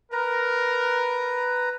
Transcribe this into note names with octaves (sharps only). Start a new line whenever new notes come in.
A#4 B4 A#5